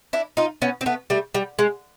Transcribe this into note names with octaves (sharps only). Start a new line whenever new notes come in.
D4 E4
D#4 F4
B3 C#4
C4
A3 B3
G3 A3
G3
G#3